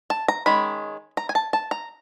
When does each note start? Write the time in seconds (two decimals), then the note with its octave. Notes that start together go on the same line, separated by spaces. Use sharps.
0.10 A5
0.28 A#5
0.46 D#3 G#3 C#4 B5
1.17 A#5
1.29 G#5
1.35 A5
1.53 A5
1.71 A#5